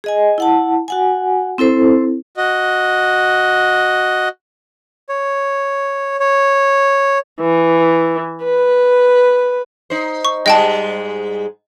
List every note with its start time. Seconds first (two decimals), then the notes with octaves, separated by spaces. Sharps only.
0.04 G#4 D#5 G#5
0.38 E4 F#5 A5
0.88 F#4 F#5 G#5
1.58 C4 E4 A4 C5
2.37 F#4 D#5
5.09 C#5
6.20 C#5
7.40 E3
8.44 B4
9.90 D#4 C5
10.25 C#6
10.46 G#2 G3 G#3 D#5 G5 A5